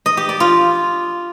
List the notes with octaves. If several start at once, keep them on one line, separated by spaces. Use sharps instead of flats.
D#5
G4
D5
F4